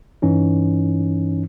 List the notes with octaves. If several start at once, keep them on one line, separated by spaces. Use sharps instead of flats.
G2 E3 C#4 D#4